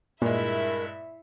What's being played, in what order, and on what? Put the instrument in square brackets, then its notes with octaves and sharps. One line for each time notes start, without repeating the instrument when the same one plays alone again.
[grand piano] G2 G#3 [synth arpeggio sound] A#2 [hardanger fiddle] E4 E5 [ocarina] A#4